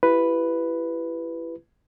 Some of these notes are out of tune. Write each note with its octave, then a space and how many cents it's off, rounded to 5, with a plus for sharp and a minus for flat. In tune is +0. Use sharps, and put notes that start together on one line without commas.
E4 +30 G4 +0 B4 +0